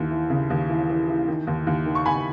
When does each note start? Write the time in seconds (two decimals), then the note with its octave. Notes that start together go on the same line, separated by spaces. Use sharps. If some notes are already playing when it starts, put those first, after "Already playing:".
Already playing: D#2 E3
0.11 E3
0.30 C#3
0.50 D#2
0.69 E3
0.89 E3
1.08 E3
1.28 D#3
1.47 D#2
1.67 D#2
1.86 D#3
1.95 C#6
2.06 D#2 G#5 B5